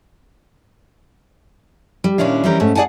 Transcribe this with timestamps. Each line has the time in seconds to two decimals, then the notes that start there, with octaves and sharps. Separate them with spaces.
2.04 G3
2.18 D#2 A#2 C#4 D4 E4 F5
2.44 E3 G3 C4 C#4 G4 A#4
2.60 G#2 A3 C#4
2.75 G#4 D5 F#5 G#5 A5